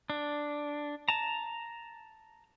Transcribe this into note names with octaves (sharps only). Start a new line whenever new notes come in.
D4
A5 A#5